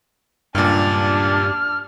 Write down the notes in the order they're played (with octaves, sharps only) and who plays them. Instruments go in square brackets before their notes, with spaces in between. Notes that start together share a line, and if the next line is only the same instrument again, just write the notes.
[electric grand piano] C#2 A#2 [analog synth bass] G2 [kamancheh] D4 [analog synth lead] F6